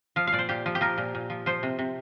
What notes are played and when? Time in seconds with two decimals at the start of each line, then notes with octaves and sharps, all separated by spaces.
0.16 F3 F5
0.27 F5
0.33 A#2 D5
0.39 C5
0.49 A#2 G4
0.66 F3
0.75 G4
0.81 F3 A#4
0.98 A#2
1.15 A#2
1.30 F3
1.46 F3 C5
1.63 C3
1.79 C3